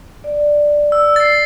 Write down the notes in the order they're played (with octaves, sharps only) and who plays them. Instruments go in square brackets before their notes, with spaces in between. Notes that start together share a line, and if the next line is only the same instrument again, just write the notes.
[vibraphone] D5
[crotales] E6
A6 C7